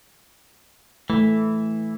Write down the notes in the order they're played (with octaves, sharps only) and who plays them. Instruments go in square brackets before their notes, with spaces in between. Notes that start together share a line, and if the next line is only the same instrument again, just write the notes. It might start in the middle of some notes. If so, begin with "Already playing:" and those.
[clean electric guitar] E3 [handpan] A3